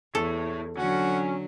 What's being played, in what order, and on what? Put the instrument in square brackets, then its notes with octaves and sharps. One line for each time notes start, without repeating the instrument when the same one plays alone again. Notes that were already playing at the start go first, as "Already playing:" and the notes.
[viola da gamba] E2 [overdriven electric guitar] E4 C#5 [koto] A4
[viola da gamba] D3 F#3 [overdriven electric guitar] C#4 [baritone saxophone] F#4